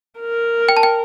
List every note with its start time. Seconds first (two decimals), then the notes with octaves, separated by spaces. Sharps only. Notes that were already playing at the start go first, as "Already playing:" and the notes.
0.20 A#4
0.69 G5
0.77 A5
0.83 G5